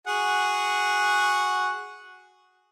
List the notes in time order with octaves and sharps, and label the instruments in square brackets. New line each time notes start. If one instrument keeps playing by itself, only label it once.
[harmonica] F#4 G#4 F#5